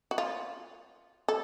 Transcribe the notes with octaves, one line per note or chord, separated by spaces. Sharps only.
F#4
F4
A4